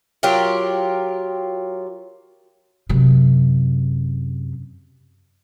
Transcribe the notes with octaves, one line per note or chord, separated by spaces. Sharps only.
F#3 F4 G4 A#4
F#2 C3